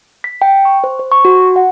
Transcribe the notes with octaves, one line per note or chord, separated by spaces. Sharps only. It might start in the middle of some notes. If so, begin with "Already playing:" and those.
B6
G5
C#6
C5
C5
C#6
F#4
F#5